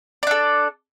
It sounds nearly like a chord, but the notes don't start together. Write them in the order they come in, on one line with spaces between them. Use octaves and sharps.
D5 D4 A4